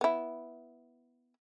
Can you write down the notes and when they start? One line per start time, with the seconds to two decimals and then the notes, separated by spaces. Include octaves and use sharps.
0.01 B3 E4